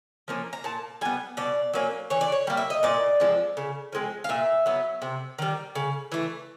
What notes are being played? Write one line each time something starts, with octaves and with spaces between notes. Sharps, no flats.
F3 A#3 C#4
A#5
A#2 A5
G3 B3 G#5
B2 D5
F#3 A#3 C#4
E3 C#5
D5
C#5
G3 A#3
E5
D#5
A#2 D5
F3 G#3 C4
C#3
F3 G#3 C4
F5
A#2 E5
F#3 B3
C3
D#3 G3
C#3
E3 A3